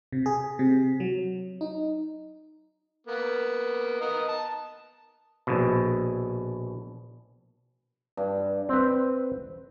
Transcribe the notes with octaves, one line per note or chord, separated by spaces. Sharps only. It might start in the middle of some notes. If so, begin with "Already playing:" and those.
C3
G#4
C3
F#3
D#4
A#3 B3
B3 A#4 D#5
A5
A#1 B2
G2
C4 B4